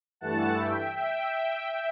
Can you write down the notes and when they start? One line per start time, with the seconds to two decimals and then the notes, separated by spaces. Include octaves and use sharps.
0.21 G2 E3 A3 F#5 A5
0.57 E5 G5
0.95 E5 G5